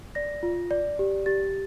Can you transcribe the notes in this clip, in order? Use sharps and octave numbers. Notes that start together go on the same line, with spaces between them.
D5 A#6
F4
D5
G4
G4 A6